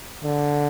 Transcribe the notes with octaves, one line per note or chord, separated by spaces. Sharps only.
D3